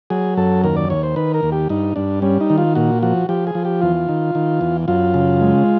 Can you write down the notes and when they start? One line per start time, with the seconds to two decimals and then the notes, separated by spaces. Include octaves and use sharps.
0.10 F#3 G#4
0.37 F#2 A4
0.64 D#2 A#4
0.76 D5
0.90 D#2 C#5
1.03 C5
1.16 D#3 B4
1.34 A#4
1.43 D#2
1.52 G4
1.69 G2 D#4
1.96 G2 D4
2.22 G3 C#4
2.41 D#4
2.50 D#3
2.58 F4
2.75 A#2 F#4
3.03 F3 F#4
3.29 F3 G4
3.47 G#4
3.55 F3
3.65 G4
3.81 E2 F4
4.09 D#3
4.35 D#3
4.61 E2
4.88 F#2 F4
5.14 C#3
5.41 G#3